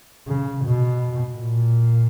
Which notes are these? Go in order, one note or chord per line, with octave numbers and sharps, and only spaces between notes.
C#3
B2
A#2